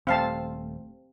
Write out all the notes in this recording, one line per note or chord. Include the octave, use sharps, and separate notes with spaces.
D#1 A3 C4 F5 A5